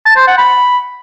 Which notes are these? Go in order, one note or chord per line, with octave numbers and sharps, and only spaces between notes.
A5
C5
F#5
B5